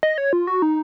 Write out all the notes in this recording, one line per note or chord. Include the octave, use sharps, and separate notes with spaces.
D#5
C#5
F4
F#4
D#4